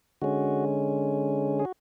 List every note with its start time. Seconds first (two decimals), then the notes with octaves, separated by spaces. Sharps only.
0.22 D3 G#3 C#4 F#4
1.59 G#4
1.65 F#4